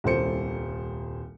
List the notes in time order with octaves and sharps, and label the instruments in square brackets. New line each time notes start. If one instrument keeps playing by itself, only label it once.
[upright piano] D#1 C2 A4 C5 C#7